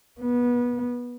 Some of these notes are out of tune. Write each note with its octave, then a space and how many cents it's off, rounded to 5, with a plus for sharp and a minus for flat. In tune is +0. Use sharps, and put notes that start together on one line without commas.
B3 -20